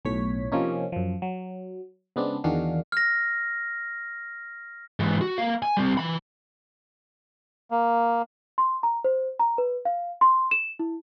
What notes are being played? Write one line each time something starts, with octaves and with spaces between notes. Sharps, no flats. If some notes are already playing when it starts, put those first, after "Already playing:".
B1 A2 C#5 B6
C3 F3 A#3 C#4 D#4
F#2 F3
F#3
C#3 G#3 B3 C4 D4
E2 D#3 D4 F#4 G#4 F5
F6 A#6
G#2 E3
F#4
A#3 F5
G#5
G3 C4
E3 B5
A#3
C6
A#5
C5
A#5
B4
F5
C6
E7
E4